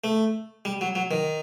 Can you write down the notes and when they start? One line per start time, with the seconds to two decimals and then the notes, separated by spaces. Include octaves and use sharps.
0.04 A3
0.65 G3
0.81 F#3
0.95 F#3
1.11 D#3